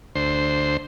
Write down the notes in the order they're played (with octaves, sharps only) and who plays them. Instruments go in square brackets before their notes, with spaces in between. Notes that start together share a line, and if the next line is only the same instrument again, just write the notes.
[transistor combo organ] D2 C5